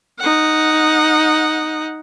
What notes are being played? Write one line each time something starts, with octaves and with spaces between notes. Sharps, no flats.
D#4 F#5